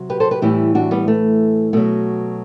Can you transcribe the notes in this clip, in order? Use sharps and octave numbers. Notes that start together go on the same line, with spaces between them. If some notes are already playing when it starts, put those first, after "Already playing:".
Already playing: C3 F#3
G4 B4
A4 C5
G4 B4
A2 E3 G3 E4 G4
D4 F#4
G3 B3
A3
B2 F#3 A3